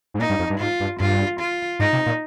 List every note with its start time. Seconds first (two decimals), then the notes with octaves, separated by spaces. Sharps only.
0.14 G#2
0.19 A#2 D#4
0.29 G2
0.39 F2
0.50 G2
0.60 G#2 F4
0.80 G2
1.00 G2 F4
1.39 F4
1.79 G#2 D#4
1.93 C3
2.06 A#2